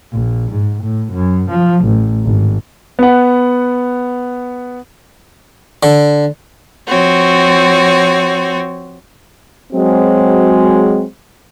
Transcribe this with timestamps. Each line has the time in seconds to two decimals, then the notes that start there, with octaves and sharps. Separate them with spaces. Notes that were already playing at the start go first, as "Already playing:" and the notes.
0.12 A#1
0.52 G#2
0.83 A2
1.12 F#2
1.50 F3
1.85 A1
2.25 G#1
2.99 B3 F#5
5.83 D3
6.87 F3 C4 F#4 C#5
9.73 F#3 G#3 C4